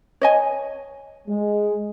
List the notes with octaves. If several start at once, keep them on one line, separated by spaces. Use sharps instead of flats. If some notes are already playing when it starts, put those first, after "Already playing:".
C#5 D#5 G#5
G#3